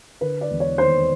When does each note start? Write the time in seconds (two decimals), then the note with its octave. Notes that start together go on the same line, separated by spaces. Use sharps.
0.21 D3 B4
0.41 D5
0.50 E1
0.60 C#5
0.78 D#2 C5